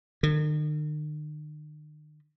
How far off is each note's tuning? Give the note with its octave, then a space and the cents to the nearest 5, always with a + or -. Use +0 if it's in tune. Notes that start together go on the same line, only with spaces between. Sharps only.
D#3 -45